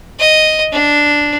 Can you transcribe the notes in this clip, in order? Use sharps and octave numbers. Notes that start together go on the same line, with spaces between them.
D#5
D4